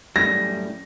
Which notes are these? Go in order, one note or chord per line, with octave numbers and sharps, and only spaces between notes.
F#2 A2 G3 A#6